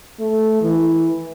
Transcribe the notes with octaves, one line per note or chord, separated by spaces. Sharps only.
A3
E3